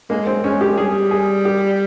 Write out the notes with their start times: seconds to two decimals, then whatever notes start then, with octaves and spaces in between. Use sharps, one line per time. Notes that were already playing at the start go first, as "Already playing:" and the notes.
0.10 G#3 A#3
0.27 C4
0.43 G#3 C#4
0.61 G4
0.77 G3 G#4
1.11 G#4
1.45 G4